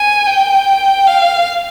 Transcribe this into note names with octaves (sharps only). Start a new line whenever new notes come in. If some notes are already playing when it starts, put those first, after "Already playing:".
Already playing: G#5
G5
F5